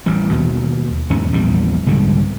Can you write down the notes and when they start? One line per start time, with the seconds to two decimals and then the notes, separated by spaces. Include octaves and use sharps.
0.06 A1 E3 G3
0.32 D#2 B2
1.10 E2 G#2 D#3 C#4
1.32 A#1 E2 E3 G3
1.86 C2 G#2 D3 G3